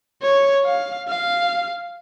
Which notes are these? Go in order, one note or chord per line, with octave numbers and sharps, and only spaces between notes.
C#5
F5
F5